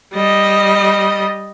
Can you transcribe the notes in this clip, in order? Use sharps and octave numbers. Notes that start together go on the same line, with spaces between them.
G3 D#5